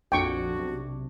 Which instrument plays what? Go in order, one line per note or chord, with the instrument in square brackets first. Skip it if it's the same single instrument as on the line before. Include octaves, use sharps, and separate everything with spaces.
[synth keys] A#1 F2 [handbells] D4 D6 [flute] F#4 [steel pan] G5 C#6
[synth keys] B1 C3